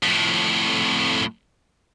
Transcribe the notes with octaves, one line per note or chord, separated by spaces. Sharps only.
F2 A2